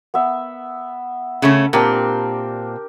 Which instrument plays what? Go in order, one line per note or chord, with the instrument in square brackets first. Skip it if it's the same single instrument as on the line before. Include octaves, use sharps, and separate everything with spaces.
[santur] B3 E5
[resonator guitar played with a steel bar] C#3 A3 C#4
[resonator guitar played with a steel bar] A#2 C4 [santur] D4 G4 A#4